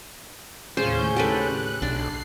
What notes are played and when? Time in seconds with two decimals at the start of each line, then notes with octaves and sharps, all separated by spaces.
0.77 D#2 A2 C#3 C#4 F4 C5 G6
1.16 G4 A4 B4 F#6
1.82 B1 D4 C7